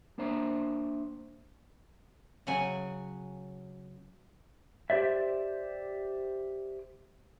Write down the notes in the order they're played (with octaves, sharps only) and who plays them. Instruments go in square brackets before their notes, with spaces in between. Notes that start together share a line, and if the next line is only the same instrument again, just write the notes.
[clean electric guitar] A#3 D4 C5 E5 A#5
[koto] C#3 F#3 F#5 G#5
[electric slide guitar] G4 C5 D5 E5